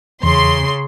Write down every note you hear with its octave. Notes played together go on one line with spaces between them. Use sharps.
E2 C#3 C6